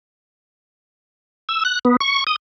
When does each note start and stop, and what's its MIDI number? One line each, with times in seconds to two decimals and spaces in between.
1.49 1.63 88
1.65 1.79 90
1.85 1.96 59
2.00 2.24 85
2.27 2.36 87